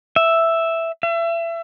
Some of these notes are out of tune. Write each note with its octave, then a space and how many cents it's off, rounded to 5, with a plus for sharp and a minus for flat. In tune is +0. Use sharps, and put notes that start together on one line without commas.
E5 +0
E5 +30